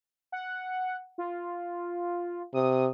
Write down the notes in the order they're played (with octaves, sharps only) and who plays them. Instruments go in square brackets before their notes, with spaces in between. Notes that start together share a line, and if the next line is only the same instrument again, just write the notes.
[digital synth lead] F#5
F4
[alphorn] C3 [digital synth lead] D#6